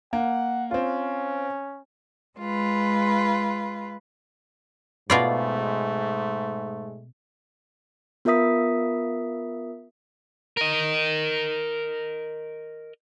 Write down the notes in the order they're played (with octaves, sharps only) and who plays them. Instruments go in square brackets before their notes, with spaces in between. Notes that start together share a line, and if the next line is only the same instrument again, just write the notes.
[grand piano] A#3 [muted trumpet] F#5
[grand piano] C4 F4 [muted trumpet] C#4
[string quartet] G#3 F4 B4
[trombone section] G#2 G#3 A3 [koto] B2 F4 D5
[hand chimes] B3 F4 A#4 E5 D#6 B6
[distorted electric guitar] A#4 D#5